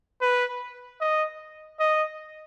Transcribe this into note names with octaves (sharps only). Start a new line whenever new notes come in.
B4
D#5
D#5